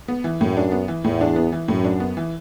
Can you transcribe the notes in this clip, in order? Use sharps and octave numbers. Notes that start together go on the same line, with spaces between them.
B3
E3
F#2 A2
D4
B3
E3
E2 A2
D4
B3
E3
F#2 A2
D4
B3
E3